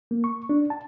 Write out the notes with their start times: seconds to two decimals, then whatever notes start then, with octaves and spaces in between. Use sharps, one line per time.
0.11 A#3
0.24 C#6
0.49 D4
0.70 A5